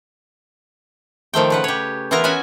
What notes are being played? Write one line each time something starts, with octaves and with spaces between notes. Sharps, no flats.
D#3 F3 A3 G5
C#3 B4 F#5
G4 C#5
E3 B3 E4 F4 A#4 A#5
B3 C#4 F#4 E5 G#5